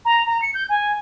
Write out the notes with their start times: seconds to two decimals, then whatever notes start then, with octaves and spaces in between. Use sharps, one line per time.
0.05 A#5
0.26 A#5
0.42 C#7
0.54 G6
0.69 G#5